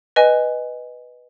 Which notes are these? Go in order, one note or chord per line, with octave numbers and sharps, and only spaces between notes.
B4 D#5 G#5